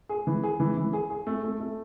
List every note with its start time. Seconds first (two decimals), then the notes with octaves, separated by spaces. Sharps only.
0.09 G#4
0.27 E3
0.43 G#4
0.60 E3
0.77 E3
0.93 G#4
1.10 G#4
1.27 A3
1.43 A3
1.60 A3